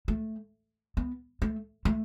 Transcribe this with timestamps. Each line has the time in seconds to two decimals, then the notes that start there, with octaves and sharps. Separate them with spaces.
0.08 A3
0.97 B3
1.42 A3
1.85 A3